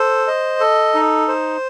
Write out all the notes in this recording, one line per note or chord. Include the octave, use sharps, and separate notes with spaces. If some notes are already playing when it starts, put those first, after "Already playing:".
Already playing: A4 C5
D#5
A4
D#4
C5